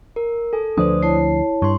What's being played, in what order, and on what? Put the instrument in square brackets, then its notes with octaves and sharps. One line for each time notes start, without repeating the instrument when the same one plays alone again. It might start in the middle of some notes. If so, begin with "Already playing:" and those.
[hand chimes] A#4
A4 G#5
[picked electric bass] D2 F3 D4 [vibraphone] B4 [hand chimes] C5 D5 D#6
[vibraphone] E4 C#5 A5 [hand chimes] C7
[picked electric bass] G2 [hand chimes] C6 C#6